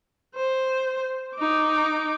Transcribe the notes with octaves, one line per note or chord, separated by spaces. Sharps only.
C5
D#4 D6